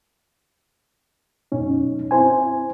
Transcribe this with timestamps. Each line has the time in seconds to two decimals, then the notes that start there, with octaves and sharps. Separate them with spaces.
1.52 F#2 B2 C#4 D#4
2.11 C4 E4 C5 G#5